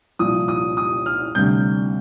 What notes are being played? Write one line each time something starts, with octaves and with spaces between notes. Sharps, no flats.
C2 A#2 F3 D#6
D#6
D#6
F6
D2 C3 G3 G6